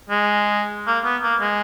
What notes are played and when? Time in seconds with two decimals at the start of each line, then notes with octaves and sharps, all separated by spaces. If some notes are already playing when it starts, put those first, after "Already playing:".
0.10 G#3
0.87 A#3
1.05 B3
1.23 A#3
1.40 G#3